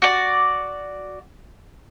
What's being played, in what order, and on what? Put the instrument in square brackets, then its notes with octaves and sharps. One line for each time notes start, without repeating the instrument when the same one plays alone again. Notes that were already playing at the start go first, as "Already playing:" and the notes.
[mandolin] F#4 D5